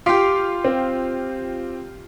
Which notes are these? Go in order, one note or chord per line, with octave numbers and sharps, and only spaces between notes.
F4 G4 C6 D6 B6
C4